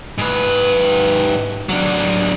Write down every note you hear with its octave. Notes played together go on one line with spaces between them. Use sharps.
G#2 B4
F#3 D4